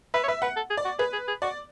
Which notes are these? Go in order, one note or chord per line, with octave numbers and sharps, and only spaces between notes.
B4 E5
C#5
B4 E5
B4 F#5
A4
G#4
D5
F#4
G#4 B4
G#4
G#4
F#4 D5